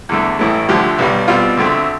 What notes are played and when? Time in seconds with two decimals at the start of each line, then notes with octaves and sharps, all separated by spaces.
0.09 E2 D3 A3
0.39 A1 A2 E3 A3
0.69 D2 D3 F3 A3 G4
0.99 B1 B2 G3
1.28 B2 G3 C4 F4
1.57 D2 D3 A3 C4